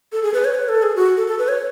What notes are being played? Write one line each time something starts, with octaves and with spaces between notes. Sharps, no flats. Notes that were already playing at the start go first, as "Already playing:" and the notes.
A4
G#4
B4
C#5
B4
A4
G#4
F#4
A4
A4
B4
C#5